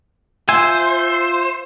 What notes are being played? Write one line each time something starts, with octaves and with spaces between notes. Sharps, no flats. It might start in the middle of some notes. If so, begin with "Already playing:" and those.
F4 C5 E5 G#5